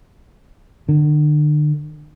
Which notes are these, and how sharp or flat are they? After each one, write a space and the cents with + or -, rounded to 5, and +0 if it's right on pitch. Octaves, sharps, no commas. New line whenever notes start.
D3 +35